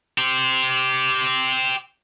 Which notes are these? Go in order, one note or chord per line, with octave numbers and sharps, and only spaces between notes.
G4 C5